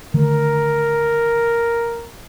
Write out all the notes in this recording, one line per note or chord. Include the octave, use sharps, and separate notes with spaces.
D3 D#3 A3 A#4